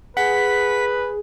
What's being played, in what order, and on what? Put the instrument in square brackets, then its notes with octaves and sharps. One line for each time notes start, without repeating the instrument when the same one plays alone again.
[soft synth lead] G#4 [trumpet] B4 [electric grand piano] F#5 [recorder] B6